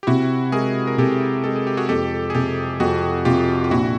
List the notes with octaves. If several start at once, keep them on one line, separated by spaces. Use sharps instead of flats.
G4
C3 E4 F#4
G#3 G#4 A#4
A#4
C3 G4 A4
G#3 A4
G#4
G4
F#4 G#4
F2 G4 A4
G#4
C3 G4 A4
F2 F#4 G#4
C3 F4 G4
F4
A#1 E4 F#4